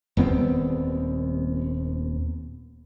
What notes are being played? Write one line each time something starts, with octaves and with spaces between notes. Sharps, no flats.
D#1 D#2 B3 C4